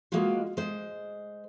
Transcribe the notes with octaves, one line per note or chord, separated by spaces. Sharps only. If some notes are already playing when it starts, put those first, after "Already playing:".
G#3 A#3 B3 F4 F#4
G#3 C5